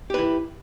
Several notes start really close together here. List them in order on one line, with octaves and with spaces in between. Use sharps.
G4 B4 E4